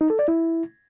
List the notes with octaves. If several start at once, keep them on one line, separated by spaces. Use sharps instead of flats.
D#4
A4
D5
E4